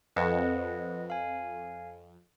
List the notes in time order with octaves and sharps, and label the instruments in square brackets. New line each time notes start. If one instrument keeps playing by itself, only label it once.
[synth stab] F2 [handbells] B4 D#5 F#5
[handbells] F5 G#5